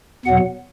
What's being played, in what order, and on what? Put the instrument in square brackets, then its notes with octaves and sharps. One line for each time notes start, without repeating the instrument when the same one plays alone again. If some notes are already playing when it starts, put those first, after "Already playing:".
[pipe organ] E2 B2 F#3 F#5